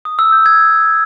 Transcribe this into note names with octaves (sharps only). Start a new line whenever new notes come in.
D#6
E6
G6
G#6